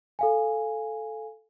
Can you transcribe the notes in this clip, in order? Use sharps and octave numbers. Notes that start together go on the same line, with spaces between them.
A4 F5 G#5